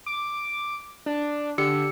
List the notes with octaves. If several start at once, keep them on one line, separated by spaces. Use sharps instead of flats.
D6
D4
D3 G4 E6 C#7